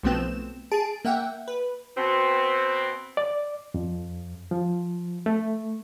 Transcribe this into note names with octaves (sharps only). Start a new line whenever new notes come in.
B1 F3 A3 B3 C4 E7
G#4 A5 D7
A#3 E5 F#5 G5
B4
B2 C4
D5
F2
F3
A3